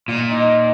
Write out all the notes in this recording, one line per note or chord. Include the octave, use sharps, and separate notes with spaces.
A#2 F4
D#4